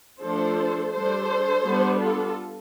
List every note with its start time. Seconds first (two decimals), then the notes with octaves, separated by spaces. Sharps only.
0.21 F3 A3 D4 A4 C5
0.93 G3 D4 A4 C5
1.64 G3 B3 D4
2.00 F4 A4